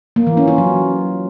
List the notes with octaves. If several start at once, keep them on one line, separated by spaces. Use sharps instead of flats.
A#3
E3
C#4
F4
F#3